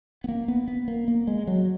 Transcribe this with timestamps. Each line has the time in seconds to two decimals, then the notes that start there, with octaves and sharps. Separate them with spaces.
0.24 B3
0.28 A#3
0.48 B3
0.68 B3
0.88 A#3
1.08 A#3
1.27 G#3
1.47 F#3